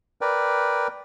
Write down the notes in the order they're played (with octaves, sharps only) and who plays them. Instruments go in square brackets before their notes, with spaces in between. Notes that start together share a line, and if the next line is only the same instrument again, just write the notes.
[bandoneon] A#4 B4 D5 G5